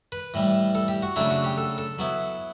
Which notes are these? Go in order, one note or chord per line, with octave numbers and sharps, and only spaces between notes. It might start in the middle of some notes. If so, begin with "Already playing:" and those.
B4
A2 E3 G3
A4
G4
F#4
C#3 F#3 A3 D4 E4
F#4
G4
A4
A4
F#3 B3 E4